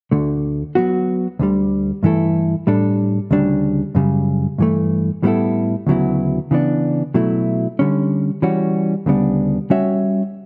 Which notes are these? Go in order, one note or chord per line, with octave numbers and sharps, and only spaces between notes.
D2 D3 A3
F#3 B3 F#4
D2 D3 G3
G2 E3 A3 E4 A4
A2 G3 D4 A4
D2 C#3 G3 D4
F#2 C#3 G3
G2 E3 A3
A2 G3 B3 E4 A4
D2 C#3 F#3 B3 E4
C#3 E3 B3 D4
B2 F#3 A3 E4
D3 G3 C#4
E3 G3 C#4 F#4
D2 C#3 G3 B3 D4
G3 C#4 F#4 C#5 E5